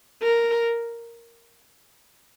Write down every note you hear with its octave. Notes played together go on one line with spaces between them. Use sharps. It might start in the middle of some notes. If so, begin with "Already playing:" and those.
A#4